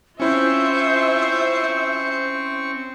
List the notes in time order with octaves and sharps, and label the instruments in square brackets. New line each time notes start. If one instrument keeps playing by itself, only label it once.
[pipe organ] C4 C#6 [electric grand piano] C#4 E4 [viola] F4 E5 [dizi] C5